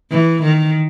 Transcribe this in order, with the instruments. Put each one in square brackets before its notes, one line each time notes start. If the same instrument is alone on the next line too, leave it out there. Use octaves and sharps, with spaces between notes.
[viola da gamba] E3
D#3